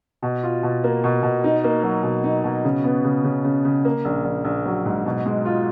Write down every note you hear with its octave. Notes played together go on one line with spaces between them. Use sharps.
B2
F4
B2
A#3
B2
B2
D#4
A#3
F#3
B2
D#4
B2
C#3
B3
C#3
C#3
C#3
C#3
A#3
A#1
A#1
A#1
F#3
G#2
B2
G#3
F4